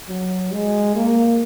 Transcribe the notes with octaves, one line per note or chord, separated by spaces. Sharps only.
F#3
G#3
A#3